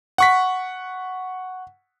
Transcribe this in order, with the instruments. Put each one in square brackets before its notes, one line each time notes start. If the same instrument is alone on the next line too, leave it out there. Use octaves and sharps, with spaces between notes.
[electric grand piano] F#5 C#6 B6